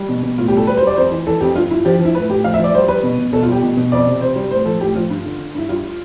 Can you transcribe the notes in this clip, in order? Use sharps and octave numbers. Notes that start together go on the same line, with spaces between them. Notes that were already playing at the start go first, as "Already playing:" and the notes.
Already playing: G3
B2
B2
A2 F4
G4
G3 A4
G3 B4
C5
G3 D5
F2 C5
E3
E3 A4
F2 G4
G2 F4
G2 E4
F3 G4
F3
E4
A2 B4
A2 G4
F3 F5
E5
F3 D5
G3 C5
G3 B4
B2
B2
B2 A4
F4
G3 G4
B2
B2
F2 D5
C3
C3 C5
G3
A2 C5
F3 A4
A2 G4
F3 F4
G2
D3
D3
G2 E4
G3 F4